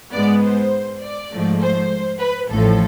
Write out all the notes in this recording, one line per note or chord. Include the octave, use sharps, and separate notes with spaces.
G#2 G#3 B3 D5
C5
D5
G#2 F3 A3
C5
B4
A1 A2 F3 A4